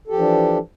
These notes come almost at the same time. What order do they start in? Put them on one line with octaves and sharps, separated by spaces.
A4 G4 F3 E3 D4